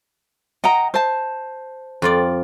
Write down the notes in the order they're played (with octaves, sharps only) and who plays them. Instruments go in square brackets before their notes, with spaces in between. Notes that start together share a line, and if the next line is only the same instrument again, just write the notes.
[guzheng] D#5 [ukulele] F#5 G5 A#5
[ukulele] C5 A5
[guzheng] F2 F4 D5